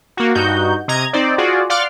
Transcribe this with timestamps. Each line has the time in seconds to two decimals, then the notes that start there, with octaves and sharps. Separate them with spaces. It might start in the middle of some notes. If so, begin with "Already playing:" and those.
0.17 A#3 F#4
0.35 G2 D#4 F#4 G6
0.88 C3 D#5 A#5 G#6
1.13 C4 D#4 C5 D5
1.38 F4 F#4 G#4 D5
1.70 D5 F5 F#5 C6 D6 F6